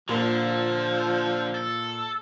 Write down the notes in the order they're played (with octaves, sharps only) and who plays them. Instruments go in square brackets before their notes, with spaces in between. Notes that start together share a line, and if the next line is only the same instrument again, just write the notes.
[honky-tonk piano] A#2 A#3 [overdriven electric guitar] D3 D4 [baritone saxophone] F3
[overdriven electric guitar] A4